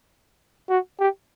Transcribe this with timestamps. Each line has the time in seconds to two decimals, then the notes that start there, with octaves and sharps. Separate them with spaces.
0.70 F#4
1.00 G4